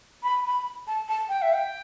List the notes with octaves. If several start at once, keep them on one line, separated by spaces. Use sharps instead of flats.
B5
B5
A5
A5
G5
E5
G5